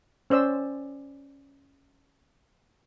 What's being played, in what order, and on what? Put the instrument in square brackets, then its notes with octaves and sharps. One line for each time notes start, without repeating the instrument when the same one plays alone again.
[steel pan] C#4 C5 D5 E6